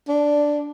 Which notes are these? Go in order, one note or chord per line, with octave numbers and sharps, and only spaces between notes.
D4